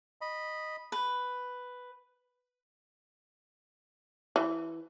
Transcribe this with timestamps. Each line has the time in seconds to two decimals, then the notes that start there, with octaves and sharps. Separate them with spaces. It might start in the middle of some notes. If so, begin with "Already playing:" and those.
0.21 D#5 B5
0.92 B4
4.36 E3